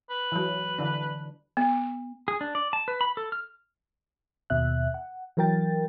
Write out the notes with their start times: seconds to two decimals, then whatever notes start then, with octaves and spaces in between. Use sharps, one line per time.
0.10 B4
0.32 E3 F#3
0.78 D3 E3 D4
1.57 B3
2.28 G#4
2.41 D4
2.55 D5
2.73 A5
2.88 B4
3.01 B5
3.17 A4
3.32 F6
4.50 D#2 B2 E5 F#6
4.94 F#5
5.37 E3 F#3 A#4 G5 A6